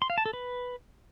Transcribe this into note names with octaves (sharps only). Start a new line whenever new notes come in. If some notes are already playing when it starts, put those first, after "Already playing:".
C6
F5
A5
A4
B4